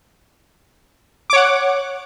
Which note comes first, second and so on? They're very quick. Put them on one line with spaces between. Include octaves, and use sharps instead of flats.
D6 C#5 F#5